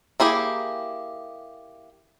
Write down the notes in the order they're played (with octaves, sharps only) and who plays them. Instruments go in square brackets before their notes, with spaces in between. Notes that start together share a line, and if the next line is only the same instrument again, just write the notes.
[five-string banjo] A#3 E4 G4 G#4